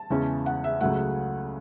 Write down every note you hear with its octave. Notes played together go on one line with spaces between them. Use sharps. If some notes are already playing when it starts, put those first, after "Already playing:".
Already playing: A5
E2 C#3 E3 G#3 C#4
F#5
E5
C#2 C#3 F#3 A3 F#5